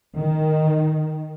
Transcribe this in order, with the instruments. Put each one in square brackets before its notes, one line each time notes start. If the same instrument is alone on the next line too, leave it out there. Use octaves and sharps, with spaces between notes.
[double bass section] D#3